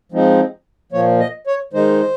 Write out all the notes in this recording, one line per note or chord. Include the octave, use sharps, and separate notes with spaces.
F3 G#3 C4 D#4
A#2 F3 A#3 C#5
D#5
C#5
D#3 G#3 D#4 C5